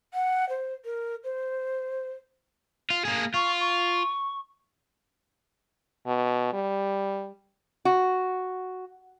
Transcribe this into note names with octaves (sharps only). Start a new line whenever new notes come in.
F#5
C5
A#4
C5
F4
A#3 G#4
F4 C#6
C#6
B2
G3
F#4